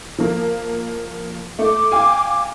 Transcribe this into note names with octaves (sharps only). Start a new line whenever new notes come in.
F3 A#3
A3 D6
F5 G5 G#5